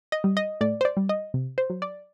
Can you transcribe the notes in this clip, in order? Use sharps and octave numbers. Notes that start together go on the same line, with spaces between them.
D#5
G3
D#5
A2 D5
C5
D5
G3
D#5
C3
C5
F#3
D5